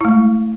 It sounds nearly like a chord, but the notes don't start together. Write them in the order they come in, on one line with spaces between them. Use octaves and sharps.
E4 A3 G#3